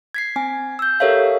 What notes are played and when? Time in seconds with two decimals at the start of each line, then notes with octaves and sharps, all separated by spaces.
0.14 G#6 B6 C7
0.36 C4 G#5
0.79 E6 G6
1.00 G4 A4 A#4 C#5 E5 F5